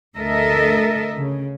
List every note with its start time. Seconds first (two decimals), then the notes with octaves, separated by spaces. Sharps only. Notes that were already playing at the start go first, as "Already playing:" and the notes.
0.16 D2 A4 A#4 D#5 E5
1.17 C#3